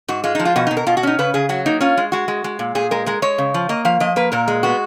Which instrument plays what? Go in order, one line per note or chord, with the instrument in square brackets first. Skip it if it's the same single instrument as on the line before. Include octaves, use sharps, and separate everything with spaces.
[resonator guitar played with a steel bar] G#2 F#4
G#3 F4
D#4
F3
F4
B2 F#4
D#4
B2
A#4
B2 F4
F#4
C#4 D#4
C#3 B4
C#3 G#4
F#3 F#4
A#3 D#4
C#4 F4
G#3
G#3 F#4
G#3
G#3
A#2
A#2 G#4
G#3 A#4
G#3 A#4
G#3 C#5
C#3
F3
A#3 D#5
F3 F5
F3 D#5
A#3 B4
A#2 A#4
G#3
B3 F#4